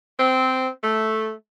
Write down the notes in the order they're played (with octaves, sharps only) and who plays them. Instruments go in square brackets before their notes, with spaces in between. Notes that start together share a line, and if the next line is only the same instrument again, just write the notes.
[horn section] C4
A3